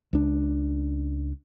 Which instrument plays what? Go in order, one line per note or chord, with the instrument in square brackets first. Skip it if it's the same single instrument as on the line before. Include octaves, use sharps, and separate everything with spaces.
[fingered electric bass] C#2 D4